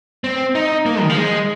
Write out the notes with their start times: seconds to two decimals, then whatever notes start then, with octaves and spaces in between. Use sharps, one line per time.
0.24 C4
0.55 D#4
0.86 A#3
1.02 D#3
1.10 F3
1.17 G#3